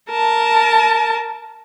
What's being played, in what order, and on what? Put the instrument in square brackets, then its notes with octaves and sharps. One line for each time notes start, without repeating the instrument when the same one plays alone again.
[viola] A#4 A5